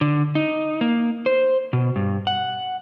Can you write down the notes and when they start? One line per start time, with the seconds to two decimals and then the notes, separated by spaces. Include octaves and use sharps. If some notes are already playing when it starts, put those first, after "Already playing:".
0.01 D3
0.35 D#4
0.81 A#3
1.26 C5
1.73 B2
1.96 G2
2.27 F#5